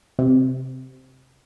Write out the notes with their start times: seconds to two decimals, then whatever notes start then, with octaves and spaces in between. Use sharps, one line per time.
0.19 C3